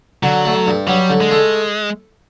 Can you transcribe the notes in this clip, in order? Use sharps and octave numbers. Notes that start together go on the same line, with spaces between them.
D3 F#3
A3
G2
F#3 G3
D3
G#3
A3